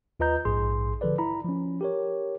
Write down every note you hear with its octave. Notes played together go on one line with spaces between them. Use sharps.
D#2 F4 B4 D#5 A#5 G6
A#1 G#2 G#4 C6
D3 F3 A4 B4 D5
E4 A#5 B5
F3 C#4
G4 A#4 C#5